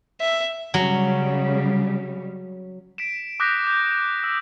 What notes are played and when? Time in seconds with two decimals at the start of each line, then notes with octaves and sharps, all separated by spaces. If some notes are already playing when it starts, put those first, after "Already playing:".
0.21 E5
0.74 C#3 F#3 G3
2.98 B6 D7 E7
3.40 D6 D#6 F#6 G6 A#6 B6
3.67 G6
4.24 E6